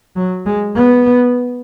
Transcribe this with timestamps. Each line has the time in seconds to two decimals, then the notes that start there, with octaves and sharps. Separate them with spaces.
0.16 F#3
0.46 G#3
0.76 B3